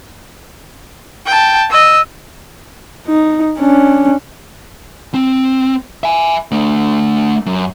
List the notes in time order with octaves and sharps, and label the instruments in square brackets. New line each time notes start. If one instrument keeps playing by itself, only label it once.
[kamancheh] G5 A5
D#5 E6
[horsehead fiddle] D#4
C#4 D4
[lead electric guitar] C4
E5 G#5
A3 D4
F#2